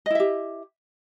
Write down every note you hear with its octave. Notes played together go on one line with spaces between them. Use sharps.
E4 G4 D#5 E5